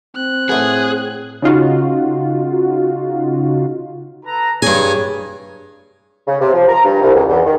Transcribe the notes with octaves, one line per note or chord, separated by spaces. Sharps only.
C4 F#6
A2 A3 B3 G#4
C#3 D#4 F4 F#4
A4 B4 A#5
G2 G#4 C#5 G#5
C#3
C3
F3
A#5
G2
C2
C#2
E2
D#3